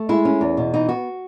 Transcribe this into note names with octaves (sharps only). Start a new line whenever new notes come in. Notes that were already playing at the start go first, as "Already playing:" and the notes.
Already playing: A3
G#3 E4
C#4
E2
B2
E3 D#4
B3 F#4